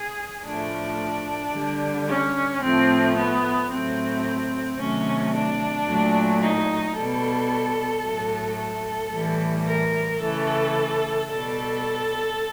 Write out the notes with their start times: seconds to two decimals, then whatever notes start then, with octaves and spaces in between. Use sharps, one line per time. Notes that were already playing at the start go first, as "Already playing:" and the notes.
Already playing: G#4
0.45 A2 F3 A3 D4
1.53 D3 G3
2.07 C#4
2.61 A2 F3 A3 C4
3.15 B3
3.70 A2 F#3 A3 C4
4.78 C3 D#3 F#3 A3 C#4
5.33 D4
5.87 A#2 F#3 A3
6.41 D#4
6.95 B2 G3 A4
8.04 A2 F#3 A3
8.58 A4
9.12 A2 E3 G3
9.66 A#4
10.20 C#3 E3 A3 A4
11.29 B2 G3 A4